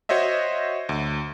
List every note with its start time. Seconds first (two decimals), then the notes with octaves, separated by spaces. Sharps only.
0.09 F#4 C5 C#5 D#5 E5
0.89 D2